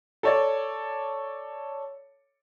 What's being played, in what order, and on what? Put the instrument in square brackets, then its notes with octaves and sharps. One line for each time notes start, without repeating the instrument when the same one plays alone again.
[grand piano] A4 C#5 D5